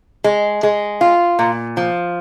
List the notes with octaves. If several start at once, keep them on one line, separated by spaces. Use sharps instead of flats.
G#3
G#3
F4
A#2
F3